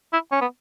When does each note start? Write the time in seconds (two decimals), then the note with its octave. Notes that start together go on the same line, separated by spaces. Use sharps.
0.13 E4
0.32 C#4
0.41 B3